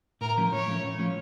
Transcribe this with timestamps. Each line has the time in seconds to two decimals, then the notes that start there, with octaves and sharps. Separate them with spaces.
0.21 A2 A#4
0.37 F3 A3 C#4
0.52 A2 C#5
0.68 F3 A3 C#4
0.83 A2
0.98 F3 A3 C#4